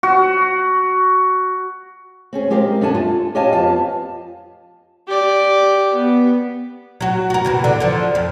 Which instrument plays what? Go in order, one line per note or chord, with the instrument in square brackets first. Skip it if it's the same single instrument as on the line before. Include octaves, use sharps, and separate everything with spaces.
[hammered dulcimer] F#4
[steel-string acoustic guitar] C4 C#4 G#4
G#3 C4 G4 A#4 F5
F#2 D4 A4 G#5 A5
F4
G4 C#5 D#5 F5 G#5 A5
F2 B3 F4 F5 A5
[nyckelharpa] G4 D5
B3
[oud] F#3 F#4
F#4 A#4
C3 E3 F#4
D3
D3 F3
F2